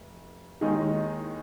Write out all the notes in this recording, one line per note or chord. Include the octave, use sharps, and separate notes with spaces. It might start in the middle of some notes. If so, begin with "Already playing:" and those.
Already playing: F1
D#2 D#3 G#3 D#4 G#4